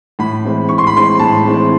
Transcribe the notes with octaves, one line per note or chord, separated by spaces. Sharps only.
A2 B5
E3 G#3 C4
A2 C#6
C6
B5
E3 G#3 C4 C6
A2 A5
E3 G#3 C4